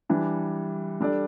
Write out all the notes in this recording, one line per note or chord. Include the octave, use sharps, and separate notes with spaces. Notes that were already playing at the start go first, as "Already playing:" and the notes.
E3 G3 D4
G3 D4 A4 D5